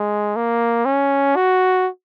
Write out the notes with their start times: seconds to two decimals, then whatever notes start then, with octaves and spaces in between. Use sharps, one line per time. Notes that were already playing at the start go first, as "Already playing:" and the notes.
Already playing: G#3
0.36 A#3
0.86 C#4
1.36 F#4